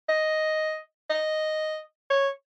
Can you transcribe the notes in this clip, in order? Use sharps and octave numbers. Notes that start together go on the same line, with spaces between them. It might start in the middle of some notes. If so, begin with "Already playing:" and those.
D#5
D#5
C#5